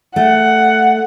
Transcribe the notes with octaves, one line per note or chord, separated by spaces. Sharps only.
A3 F#5